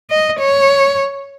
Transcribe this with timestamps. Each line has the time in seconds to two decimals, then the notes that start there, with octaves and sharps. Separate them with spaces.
0.10 D#5
0.39 C#5